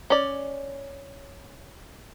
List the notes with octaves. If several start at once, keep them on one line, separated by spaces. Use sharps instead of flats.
C#4 D5